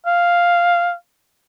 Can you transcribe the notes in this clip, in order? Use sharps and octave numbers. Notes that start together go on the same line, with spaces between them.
F5